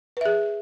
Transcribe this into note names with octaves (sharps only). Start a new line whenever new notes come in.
G#4 B4 E5